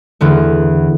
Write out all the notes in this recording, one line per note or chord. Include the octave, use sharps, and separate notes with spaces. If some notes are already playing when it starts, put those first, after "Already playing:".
E2 D3 A3